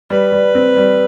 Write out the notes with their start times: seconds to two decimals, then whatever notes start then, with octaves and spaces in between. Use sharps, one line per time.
0.10 G3 B4
0.32 G3
0.55 C4
0.77 G3